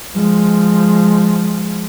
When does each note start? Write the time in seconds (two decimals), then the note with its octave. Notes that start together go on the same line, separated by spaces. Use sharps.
0.16 F3 G#3